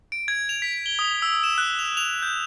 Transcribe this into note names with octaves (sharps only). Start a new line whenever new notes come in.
D7
G#6
F7
B6
G7
D#6
E6
E7
F#6
F7
F7
G6